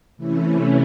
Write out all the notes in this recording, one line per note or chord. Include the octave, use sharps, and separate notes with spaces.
C3 E3 A3 C#4 E4